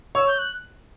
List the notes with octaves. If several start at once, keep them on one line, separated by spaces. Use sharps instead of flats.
C#5 E6
G6
F#6